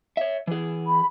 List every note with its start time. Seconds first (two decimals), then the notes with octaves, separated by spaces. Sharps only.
0.17 C#5 E5
0.47 E3 G#4
0.87 B5